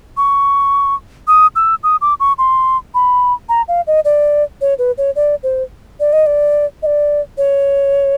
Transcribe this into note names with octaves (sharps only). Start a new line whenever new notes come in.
C#6
D#6
E6
D#6
D6
C#6
C6
B5
A#5
F5
D#5
D5
C#5
B4
C#5
D5
C5
D5
D#5
D5
D#5
D5
C#5